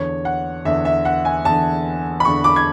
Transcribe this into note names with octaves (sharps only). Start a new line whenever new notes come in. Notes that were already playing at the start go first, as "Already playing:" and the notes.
Already playing: E2 D3 C#5
F#5
E2 D3 E5
E5
F#5
G#5
E2 D3 A5
B5
E2 D3 C#6
D6
G#6